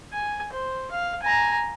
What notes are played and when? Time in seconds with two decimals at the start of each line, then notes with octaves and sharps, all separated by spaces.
0.12 G#5
0.52 C5
0.91 F5
1.22 G#5 A#5